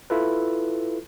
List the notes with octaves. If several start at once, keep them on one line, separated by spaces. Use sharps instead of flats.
E4 F4 A4 B4